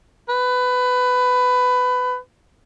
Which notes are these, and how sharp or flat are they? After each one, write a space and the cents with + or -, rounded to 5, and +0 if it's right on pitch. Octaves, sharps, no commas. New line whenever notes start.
B4 +20